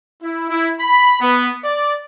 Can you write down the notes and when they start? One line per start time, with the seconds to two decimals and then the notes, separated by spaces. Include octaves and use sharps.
0.22 E4
0.51 E4
0.80 B5
1.21 B3
1.64 D5